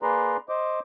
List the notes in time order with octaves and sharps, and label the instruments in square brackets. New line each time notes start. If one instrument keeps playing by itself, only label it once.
[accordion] A#3 G#4 B4 D5 A#5 C6
C5 D#5 D6